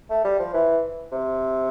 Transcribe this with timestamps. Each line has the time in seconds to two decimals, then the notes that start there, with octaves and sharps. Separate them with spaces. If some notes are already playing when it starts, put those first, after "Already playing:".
0.10 A3
0.24 G3
0.39 F3
0.54 E3
1.12 C3